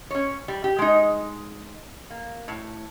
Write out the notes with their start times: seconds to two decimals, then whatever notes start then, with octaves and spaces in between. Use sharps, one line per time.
0.10 C#4 C#5
0.48 G3
0.64 G4
0.79 G#3 D#4
2.10 A#3
2.48 A2